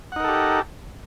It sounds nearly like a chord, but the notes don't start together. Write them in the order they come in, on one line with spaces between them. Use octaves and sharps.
F#5 D#4 A#4 A4 G4